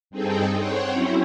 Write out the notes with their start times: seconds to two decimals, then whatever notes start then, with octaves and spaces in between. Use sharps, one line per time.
0.10 G2 C4 D#4 G#4 A4 G5
0.57 C5 C#5 F#5 G5
0.91 F#3 C4 C#4 E4